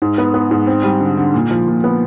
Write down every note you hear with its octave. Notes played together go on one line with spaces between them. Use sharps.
G#2
B3
B3
G#2
C4
G3
D3
D3
A#2
F3
A#2
B3